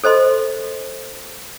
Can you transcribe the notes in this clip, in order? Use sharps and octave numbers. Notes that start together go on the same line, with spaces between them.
A4 C5 D#5 C6